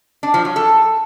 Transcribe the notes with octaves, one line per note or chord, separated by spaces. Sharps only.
D4
F3
F#3
A4